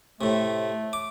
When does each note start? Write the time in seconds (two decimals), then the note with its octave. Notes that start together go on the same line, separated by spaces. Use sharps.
0.21 A2 C3 A3
0.93 D6